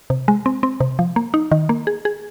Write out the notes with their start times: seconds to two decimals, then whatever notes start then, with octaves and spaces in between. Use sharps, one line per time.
0.10 C3
0.28 G#3
0.46 C4
0.63 C4
0.80 C3
0.99 F3
1.16 A#3
1.34 D#4
1.51 D#3
1.69 A#3
1.87 G#4
2.05 G#4